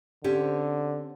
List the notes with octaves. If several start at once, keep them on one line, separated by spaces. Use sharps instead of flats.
D3 C4 C#4 G4